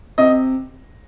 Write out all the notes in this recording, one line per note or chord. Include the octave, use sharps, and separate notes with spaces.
C3 D#5